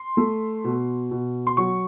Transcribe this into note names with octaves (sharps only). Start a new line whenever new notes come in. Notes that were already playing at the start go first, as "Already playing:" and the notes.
Already playing: C6
A3
B2
B2
C6
F#3 C#6